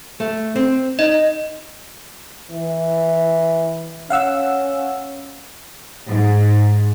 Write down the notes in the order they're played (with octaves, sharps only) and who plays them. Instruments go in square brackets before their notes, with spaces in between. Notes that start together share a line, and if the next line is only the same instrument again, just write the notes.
[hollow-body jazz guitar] A3
C4
[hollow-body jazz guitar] D#4 [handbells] D#5
[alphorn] E3
[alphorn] C#4 [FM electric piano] F5 F#5 E6
[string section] G#2